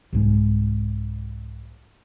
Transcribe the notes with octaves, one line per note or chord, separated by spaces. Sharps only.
C2 G#2 G#3